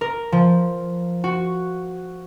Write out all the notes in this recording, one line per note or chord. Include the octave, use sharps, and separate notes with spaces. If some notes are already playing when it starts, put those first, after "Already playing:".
A#4
F3
F#4